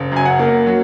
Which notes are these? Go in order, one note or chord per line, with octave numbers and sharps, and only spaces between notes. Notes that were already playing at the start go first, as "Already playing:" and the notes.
Already playing: F#1
F#2 G#5
F#5
A#3
F#3